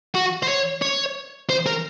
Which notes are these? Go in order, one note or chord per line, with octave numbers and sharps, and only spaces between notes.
F#4
C5
C#5
C#5
C5
A#4